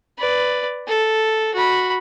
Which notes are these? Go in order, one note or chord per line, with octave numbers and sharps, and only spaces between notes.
B4 D5
A4
F#4 B5